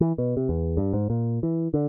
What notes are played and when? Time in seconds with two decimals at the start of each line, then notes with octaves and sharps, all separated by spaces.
0.01 E3
0.18 B2
0.37 C3
0.49 E2
0.77 G2
0.93 G#2
1.10 A#2
1.43 E3
1.74 D3